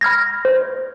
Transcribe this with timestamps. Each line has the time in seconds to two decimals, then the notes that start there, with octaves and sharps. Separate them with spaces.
0.01 B5 F6 G#6 A#6
0.45 C5